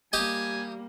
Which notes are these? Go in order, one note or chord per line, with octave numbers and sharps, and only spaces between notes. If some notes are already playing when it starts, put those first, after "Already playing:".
G3 A#3 G4 D#5 G#5